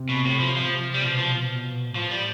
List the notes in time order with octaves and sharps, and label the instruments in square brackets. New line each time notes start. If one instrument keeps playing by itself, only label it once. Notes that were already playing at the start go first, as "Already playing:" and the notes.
Already playing: [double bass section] C3
[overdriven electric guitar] B2
A2
F3
F3
G3
[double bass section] B2 [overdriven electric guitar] F3
[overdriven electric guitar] F3
[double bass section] B2
[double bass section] A2 [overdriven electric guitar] F3
[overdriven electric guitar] G3